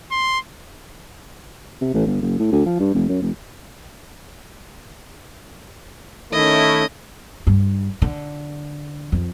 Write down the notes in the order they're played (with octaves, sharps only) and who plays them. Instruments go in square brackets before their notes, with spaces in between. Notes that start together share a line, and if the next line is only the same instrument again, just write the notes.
[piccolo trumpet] C6
[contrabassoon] C3
A1
G1
F#1
A2
D2
F3
G2
F1
F#2
F1
[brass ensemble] D#3 A3 E4 [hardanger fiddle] C#4 D#5
[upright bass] G2
D3
F2